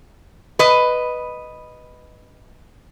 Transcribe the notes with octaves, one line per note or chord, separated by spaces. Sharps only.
B4 D#5